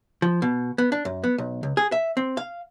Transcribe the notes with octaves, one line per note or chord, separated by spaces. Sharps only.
F3
B2
B3
D4
F#2
B3
B1
C#2
G#4
E5
C4
F5